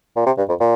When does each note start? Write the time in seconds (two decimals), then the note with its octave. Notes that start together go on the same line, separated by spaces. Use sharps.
0.16 A#2
0.26 C3
0.38 G2
0.49 F2
0.60 A#2